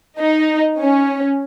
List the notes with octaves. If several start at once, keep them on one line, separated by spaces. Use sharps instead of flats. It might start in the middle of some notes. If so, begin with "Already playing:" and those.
D#4
C#4